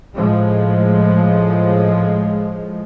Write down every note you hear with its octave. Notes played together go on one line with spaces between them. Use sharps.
A2 F3 G#3